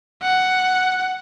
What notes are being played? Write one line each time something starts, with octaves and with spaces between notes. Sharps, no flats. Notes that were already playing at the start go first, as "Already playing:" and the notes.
F#5